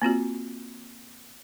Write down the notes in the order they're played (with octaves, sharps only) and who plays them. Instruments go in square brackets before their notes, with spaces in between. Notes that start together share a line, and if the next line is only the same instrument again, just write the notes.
[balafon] A#3 C4 F4 F#4